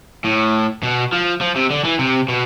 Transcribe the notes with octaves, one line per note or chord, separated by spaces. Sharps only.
A2
B2
F3
F3
C3
D3
E3
C3
B2